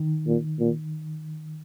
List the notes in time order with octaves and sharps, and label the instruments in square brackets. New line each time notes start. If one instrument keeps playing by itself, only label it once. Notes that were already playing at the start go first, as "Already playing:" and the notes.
Already playing: [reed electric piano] D#3
[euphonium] A#2
A#2